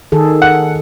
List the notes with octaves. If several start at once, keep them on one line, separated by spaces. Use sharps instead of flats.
D#3 G#4 A4
F#5